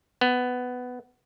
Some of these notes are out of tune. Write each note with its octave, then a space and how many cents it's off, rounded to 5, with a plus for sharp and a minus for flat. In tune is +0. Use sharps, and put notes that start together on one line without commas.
B3 +10